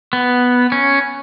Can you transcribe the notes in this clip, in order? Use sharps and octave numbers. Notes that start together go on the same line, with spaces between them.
B3
C#4